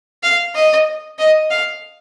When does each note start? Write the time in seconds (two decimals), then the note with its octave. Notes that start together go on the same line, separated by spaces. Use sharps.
0.23 F5
0.55 D#5
1.19 D#5
1.51 F5